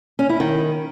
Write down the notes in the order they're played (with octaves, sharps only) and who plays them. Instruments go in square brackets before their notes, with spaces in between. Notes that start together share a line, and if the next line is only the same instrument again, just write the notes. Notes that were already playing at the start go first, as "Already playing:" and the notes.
[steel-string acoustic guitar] C#4
E4
D#3